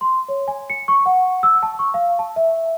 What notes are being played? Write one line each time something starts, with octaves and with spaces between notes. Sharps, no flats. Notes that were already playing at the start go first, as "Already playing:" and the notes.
C6
C#5
G#5
C#7
C#6
F#5
E6
A5
C#6
F5
A5
E5